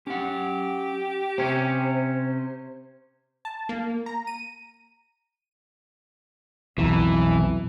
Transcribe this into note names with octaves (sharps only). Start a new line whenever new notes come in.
C#4 G4 F#5
C3 C#4 C5
A5
A#3
A#5
D#7
B1 F2 B2 E3